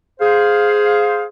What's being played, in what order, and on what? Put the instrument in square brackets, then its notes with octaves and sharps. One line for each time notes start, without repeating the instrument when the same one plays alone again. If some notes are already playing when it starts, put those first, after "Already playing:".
[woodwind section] G#4 C5 F5